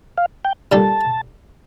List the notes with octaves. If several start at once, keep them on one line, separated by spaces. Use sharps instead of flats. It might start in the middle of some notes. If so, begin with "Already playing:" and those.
F5
G5
A#2 G3 A#3 D4 A4 A5